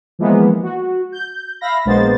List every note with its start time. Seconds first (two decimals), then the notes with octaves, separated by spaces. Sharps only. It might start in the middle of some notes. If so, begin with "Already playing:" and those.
0.19 E3 F3 G#3 A#3 B3
0.63 F#4
1.12 G6
1.61 E5 F5 B5 A#6
1.85 A#1 G#3 A#3 B3 C5 A6